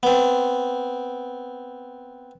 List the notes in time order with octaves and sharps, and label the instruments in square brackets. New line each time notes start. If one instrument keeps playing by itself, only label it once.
[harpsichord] B3 C4